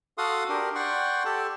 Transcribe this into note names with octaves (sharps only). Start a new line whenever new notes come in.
F#4 A4 F5 F#5 C6 D#6
D4 G4 A#4
D5 F#5 G5 C6 C#6
G4 A4 A5